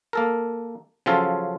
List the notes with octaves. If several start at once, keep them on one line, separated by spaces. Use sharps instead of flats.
A#3 A4 A#4
C#3 F3 F#3 F4 A4